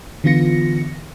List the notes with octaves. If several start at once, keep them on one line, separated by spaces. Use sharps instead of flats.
D3 E3 B3 F4 A#6 C#7